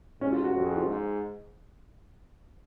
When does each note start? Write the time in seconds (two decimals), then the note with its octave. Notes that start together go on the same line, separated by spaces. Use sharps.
0.21 G#2 C#4
0.32 F4
0.44 F#4
0.54 F2 F#4
0.66 G#4
0.77 F4
0.87 G#2